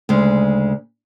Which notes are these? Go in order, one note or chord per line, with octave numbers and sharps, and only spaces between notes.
D2 C#3 G#3